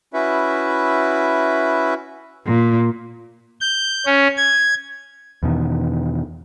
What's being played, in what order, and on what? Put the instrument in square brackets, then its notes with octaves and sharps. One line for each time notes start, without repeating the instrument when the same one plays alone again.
[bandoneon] C#4 E4 F#4 B4 E5
[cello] A#2
[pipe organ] G6
C#4
G#6
[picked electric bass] E2 B2 D#3